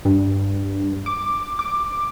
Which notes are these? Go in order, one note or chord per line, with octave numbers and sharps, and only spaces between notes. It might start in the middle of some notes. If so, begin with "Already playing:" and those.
G2
D6
D6